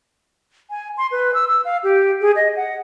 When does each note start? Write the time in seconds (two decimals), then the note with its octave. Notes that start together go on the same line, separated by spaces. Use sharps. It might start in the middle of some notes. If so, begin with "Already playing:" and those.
0.70 G#5
0.98 C6
1.12 B4
1.34 E6
1.48 E6
1.65 F5
1.84 G4
2.21 G#4
2.36 D#5
2.56 F#5